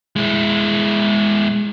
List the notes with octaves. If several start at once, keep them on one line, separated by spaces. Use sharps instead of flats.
G#3 E4